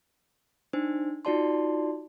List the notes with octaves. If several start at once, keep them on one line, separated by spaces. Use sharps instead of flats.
D4 D#4 C5
D#4 F4 F#4 D5 A5 C6